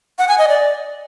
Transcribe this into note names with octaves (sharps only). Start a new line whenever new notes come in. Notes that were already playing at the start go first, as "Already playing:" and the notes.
F#5
G#5
D#5
D5